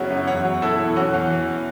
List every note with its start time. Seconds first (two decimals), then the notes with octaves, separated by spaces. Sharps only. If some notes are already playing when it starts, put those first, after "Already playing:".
Already playing: F#2 C#3 F#3 B3 C#4 E4 F#4
0.10 F#2
0.27 E2 C#5 F#5
0.45 F#3
0.62 B2 E4 A4
0.79 E2
0.96 E3 C#4 F#4
1.14 E2
1.31 E3